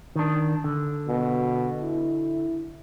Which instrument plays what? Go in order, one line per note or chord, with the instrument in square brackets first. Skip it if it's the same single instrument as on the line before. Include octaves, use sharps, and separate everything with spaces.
[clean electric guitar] D#3 D4
D3
[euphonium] B2
E4